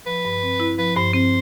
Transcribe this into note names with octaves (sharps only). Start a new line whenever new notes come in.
F3 B4
G2
C4
E4
F3 B4
G2 C5
C4 C5